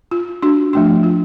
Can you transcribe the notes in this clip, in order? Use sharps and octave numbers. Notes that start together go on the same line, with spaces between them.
F4
D4 F#4
F3 A3 D4 F#4
F4